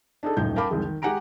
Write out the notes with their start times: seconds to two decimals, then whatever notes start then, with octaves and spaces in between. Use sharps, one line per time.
0.23 D4 D#4 G#4 A4
0.37 D#1 A1 F#2 D#4 G6
0.56 A#4 F5 G5 A5 B5 D6
0.71 C2 F2 D#3 E3 G#3
0.85 D#3
1.02 G#3 G4 F#5 G#5 A#5 D7